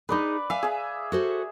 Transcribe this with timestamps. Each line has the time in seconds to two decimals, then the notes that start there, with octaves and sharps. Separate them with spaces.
0.09 D#4 G#4 B4 D5 B5
0.50 E5 F5 G#5
0.63 G#4 E5
1.12 F#4 A4 C5